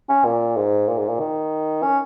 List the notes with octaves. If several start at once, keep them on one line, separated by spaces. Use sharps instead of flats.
C#4
A#2
G#2
A#2
G#2
A#2
D#3
C#4